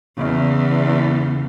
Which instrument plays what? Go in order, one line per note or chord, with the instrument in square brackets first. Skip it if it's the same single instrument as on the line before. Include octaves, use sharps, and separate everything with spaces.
[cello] E2 [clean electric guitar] C#3